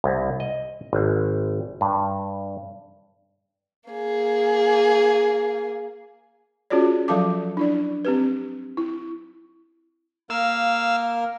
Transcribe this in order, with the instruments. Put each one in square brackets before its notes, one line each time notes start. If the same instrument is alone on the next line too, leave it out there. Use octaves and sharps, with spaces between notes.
[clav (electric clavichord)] C2
D#5
G#1
G2
[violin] A#3 G#4
[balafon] C#4 F4 F#4 G#4 C#5 D5
F3 F#3 A4 F5 A5 D6
D4 E4 D5
C4 G4 B4
E4
[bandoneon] A#3 A#4 [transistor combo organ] F5 E6